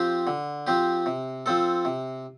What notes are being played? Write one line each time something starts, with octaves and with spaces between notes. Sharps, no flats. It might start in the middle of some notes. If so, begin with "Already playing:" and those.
Already playing: F3 C4 G4
D3
F3 C4 G4
C3
F3 C4 A4
C3